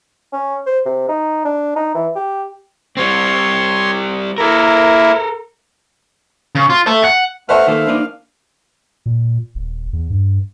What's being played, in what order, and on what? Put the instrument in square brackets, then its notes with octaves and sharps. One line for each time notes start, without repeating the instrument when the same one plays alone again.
[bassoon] C#4
C5
C3
D#4
D4
D#4
E3
G4
[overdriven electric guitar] G3 C4 [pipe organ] C#5 C6
[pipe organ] A#3 E4 [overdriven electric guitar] A4 A#4
[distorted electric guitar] C#3
F4
E5 A5
F#5
[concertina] A3 F#5 F6 [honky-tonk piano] B4 C5 E5
[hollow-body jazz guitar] D#3 A#3 A4 [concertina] F5
[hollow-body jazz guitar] A#3 D4 D#4
[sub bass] A#2
D#1
E2
G2